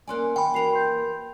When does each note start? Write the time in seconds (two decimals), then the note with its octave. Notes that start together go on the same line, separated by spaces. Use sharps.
0.07 A#3 C#4 D5 G#5 C6 F#6
0.36 D#3 G5 B5
0.54 E3 A#3 F#4 C7 F7
0.71 B4 C6 G6